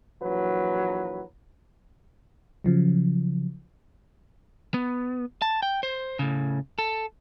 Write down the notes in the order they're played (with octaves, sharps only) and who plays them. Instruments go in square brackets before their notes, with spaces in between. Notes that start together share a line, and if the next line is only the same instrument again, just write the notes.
[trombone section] A#1 E3 F#3 B4
[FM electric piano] C#3 F3 F#3
[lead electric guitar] B3
A5
G5
C5
A2 C#3
A4